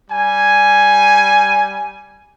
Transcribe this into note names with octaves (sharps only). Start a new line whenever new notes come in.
G3 G#5